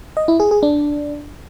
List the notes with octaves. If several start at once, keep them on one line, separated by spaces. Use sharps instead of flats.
D#5
E4
G#4
G#4
D4